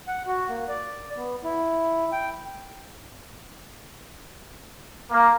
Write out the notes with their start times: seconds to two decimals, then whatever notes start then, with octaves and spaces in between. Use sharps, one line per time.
0.08 F#5
0.27 F#4
0.49 A#3
0.69 D5
1.17 B3
1.44 E4
2.12 G5
5.11 A#3